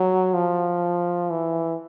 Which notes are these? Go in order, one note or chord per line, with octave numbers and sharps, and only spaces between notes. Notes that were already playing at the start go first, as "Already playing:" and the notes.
Already playing: F#3
F3
E3